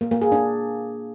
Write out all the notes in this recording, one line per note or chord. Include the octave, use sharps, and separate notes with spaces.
A#3
A#3
G#4
D4